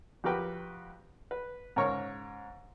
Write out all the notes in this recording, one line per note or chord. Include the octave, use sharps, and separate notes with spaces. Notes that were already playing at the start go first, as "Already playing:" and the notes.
F2 F#4 G4 A#4 B4 G5
B4
G#2 C#3 A#4 C#5 C#6